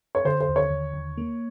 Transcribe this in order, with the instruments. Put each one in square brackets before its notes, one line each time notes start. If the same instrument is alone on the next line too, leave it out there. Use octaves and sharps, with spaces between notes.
[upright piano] C#5
[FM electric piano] D3 [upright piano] C5
[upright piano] C5
[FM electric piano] D#2
[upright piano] C#5
[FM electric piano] D#2
D#2
A#3